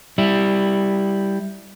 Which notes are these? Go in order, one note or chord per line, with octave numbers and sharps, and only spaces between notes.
G3 E4